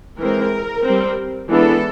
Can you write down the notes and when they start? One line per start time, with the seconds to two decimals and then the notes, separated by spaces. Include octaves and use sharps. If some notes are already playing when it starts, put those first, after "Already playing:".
0.19 E3 G#3 C4 A#4
0.85 G3 C4
1.49 E3 G#3 B3 D4 A4